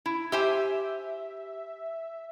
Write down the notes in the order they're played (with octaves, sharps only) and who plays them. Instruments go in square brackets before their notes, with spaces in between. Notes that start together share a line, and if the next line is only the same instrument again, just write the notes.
[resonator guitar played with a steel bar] E4
[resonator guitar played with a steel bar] G4 C5 G#5 [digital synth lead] E5